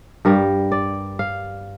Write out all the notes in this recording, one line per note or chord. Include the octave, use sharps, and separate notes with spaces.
G2 G3 A#4
D5
F5